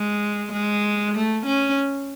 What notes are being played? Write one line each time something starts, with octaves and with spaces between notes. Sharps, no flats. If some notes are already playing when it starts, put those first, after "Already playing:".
Already playing: G#3
G#3
A3
C#4